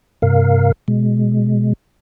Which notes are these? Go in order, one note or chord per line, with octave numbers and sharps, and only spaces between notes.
G2 C3 A#4 F5
B2 G#3